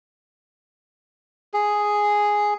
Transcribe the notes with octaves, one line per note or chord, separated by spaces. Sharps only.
G#4